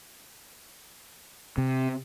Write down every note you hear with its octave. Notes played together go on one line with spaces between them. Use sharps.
C3